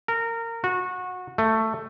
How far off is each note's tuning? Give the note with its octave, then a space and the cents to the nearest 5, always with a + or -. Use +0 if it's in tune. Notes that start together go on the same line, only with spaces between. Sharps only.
A#4 -20
F#4 -25
A3 +10